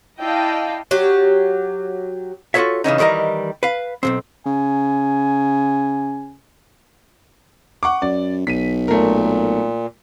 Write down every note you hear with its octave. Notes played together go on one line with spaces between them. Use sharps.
E4 D5 D#5 F5 G5 A5
F#3 G4
F4 F#4 G#4 A4 C#5 E5
C#3 E3 C#4 D#4
D#3 E3 G3 A#4 D#5
B4 F5
B1 G#2 C4
C#3 G#5
F#5 C#6 D6
F#2 D5
B1 B6 D#7
A#2 A3 A#4